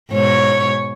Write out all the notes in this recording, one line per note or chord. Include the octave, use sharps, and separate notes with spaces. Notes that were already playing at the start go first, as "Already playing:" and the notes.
G#2 B2 C#5